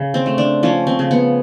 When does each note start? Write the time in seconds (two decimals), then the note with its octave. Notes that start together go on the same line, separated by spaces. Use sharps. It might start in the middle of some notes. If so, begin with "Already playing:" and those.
Already playing: C#3
0.14 C4
0.26 A3
0.38 D4
0.63 F3 C#4
0.87 C4
0.99 C#3
1.11 B3